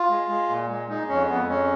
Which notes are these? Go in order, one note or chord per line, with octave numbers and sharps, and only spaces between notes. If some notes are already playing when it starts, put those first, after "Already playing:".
Already playing: F4
G#3
G#3
A#2
G#3
G#3 D#4
F2 C#4
F2 B3
G#3 C#4